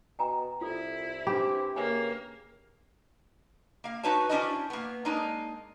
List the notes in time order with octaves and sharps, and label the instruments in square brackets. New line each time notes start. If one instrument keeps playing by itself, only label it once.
[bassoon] B2 [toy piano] G5 G#5 A#5
[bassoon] C2 [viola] E4 [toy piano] F4 A4
[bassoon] C4 [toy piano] D4 B4 B5 [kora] G4
[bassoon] C#3 [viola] A#3 [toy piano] G#4 B4 G#5
[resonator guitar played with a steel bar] A#3 F5
D#4 F#4 B4 C#5 A5
C#4 D4 E4 F#4 C5 D#5
A#3 B3
G#3 A#3 D4 D#4